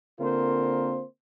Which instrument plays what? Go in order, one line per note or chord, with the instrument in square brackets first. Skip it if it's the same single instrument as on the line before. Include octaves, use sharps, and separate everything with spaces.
[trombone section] D3 A#3 C4 F4 A#4 C5